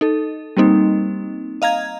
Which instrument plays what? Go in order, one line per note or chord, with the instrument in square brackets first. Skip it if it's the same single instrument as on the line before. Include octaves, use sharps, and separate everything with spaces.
[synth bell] D#4 A4
G3 A#3 C4 D#4
D#5 F5 A#5 G#6